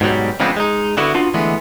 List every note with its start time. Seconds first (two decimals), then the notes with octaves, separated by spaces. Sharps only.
0.01 G#2 B2 F#3 G3
0.40 C#3 F3 G#3 B3 C4 D4
0.57 G#3 D#4
0.97 D3 B3 E4 F#4
1.14 B3 D4 F4 F#4
1.34 D3 E3 G#3 A3 B3